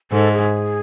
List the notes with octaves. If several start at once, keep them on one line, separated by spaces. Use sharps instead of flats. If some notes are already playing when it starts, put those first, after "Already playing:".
G#2 A4
G#4